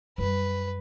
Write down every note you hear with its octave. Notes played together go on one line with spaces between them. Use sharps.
F#2 G3 B4